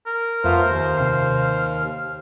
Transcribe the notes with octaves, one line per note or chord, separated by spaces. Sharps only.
A#4
F2 A3 B3 F4 C5
D#2
C3 F5 C7